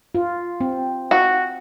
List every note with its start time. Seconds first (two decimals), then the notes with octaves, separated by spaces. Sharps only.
0.15 F4
0.61 C4
1.11 F#4